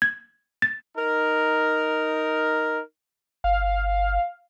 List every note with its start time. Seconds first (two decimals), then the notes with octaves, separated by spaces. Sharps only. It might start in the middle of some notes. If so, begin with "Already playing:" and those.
0.02 G#6
0.62 A6
0.96 D#4 A#4
3.44 G1 F5